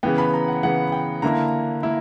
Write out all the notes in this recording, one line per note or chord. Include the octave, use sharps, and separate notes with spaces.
C#3 E3 B3 G5
B5
A#5
F#5
C#3 E3 B3 F#5
G5
D3 A#3 E4 A#5
A#3 E4